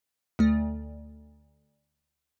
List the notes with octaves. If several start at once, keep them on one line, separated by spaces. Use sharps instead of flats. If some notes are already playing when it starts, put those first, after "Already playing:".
D2 A3